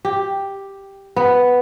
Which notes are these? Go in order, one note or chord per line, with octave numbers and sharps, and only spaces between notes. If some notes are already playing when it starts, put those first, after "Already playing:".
G4
B3